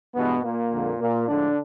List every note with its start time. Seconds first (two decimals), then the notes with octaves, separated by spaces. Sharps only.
0.15 G2 B2 E3 G#3 B3
0.44 A#2 A#3
0.72 F2 D3 F3 G#3
1.00 A#2 A#3
1.28 A2 D3 F3 G#3 D4